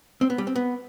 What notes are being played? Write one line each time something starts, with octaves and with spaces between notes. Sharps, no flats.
C4
B3
G3
C4
B3